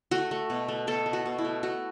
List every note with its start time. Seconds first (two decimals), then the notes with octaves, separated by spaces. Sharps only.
0.11 A3 F#4
0.31 A3
0.50 B2
0.68 A3
0.87 B2 A4
1.06 A3
1.13 F#4
1.26 B2
1.38 E4
1.45 A3
1.63 A3 F#4